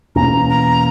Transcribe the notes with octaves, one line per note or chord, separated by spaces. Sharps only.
E2 B2 A#3 C#4 A#5
A#5